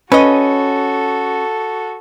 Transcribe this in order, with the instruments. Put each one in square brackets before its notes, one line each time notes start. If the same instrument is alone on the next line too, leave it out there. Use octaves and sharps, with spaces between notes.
[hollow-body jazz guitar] C#4 [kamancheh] F#4 A4 [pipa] B4 D#5